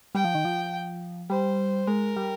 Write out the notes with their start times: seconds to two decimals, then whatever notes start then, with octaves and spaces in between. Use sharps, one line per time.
0.15 G3 G5
0.25 F3
0.35 D#3
0.45 F3
1.30 G3 C5
1.87 G#3 A#4
2.17 G3